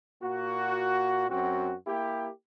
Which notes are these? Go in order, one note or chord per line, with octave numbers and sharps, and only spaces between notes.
A#2 A#3 F#4
F#2 C4 F#4
A#3 E4 G4